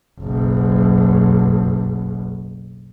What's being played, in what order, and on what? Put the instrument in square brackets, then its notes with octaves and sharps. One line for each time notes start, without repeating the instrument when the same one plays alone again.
[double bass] F#1 B1